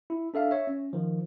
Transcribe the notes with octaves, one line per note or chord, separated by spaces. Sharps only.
E4
D4 A4 E5 F5
C#5 E5
C#4
D#3 F3